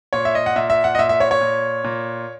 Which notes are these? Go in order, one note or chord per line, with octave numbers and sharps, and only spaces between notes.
A#2 C#5
E5
D#5
F#5
A#2 E5
E5
F#5
D#5
A#2 E5
E5
C#5
C#5
A#2
A#2